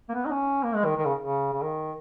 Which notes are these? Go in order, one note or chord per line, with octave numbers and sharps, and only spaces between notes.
A#3
B3
D#4
C#4
A#3
G#3
D#3
D#3
C#3
C#3
C#3
D#3